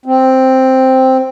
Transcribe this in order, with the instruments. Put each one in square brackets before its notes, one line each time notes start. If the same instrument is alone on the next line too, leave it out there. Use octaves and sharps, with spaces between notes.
[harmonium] C4